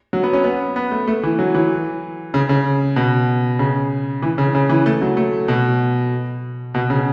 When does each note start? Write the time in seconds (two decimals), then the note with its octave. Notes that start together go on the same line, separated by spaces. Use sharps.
0.13 F#3
0.23 B3
0.33 C#4
0.44 B3
0.76 B3
0.91 A3
1.08 A3
1.23 E3
1.39 F#3
1.55 E3
2.34 C#3
2.49 C#3
2.96 B2
3.59 C#3
4.22 E3
4.38 C#3
4.55 C#3
4.69 E3
4.86 A3
5.01 F#3
5.17 A3
5.48 B2
6.74 B2
6.90 C#3